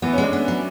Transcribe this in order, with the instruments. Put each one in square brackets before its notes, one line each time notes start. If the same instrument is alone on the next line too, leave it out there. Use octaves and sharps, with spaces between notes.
[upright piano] E3 [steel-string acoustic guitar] B3
[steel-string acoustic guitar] G#3 [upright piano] C#4
[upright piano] D4
[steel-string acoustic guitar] B3
F#3